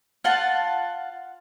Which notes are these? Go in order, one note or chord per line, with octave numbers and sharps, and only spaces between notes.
F4 F#5 A5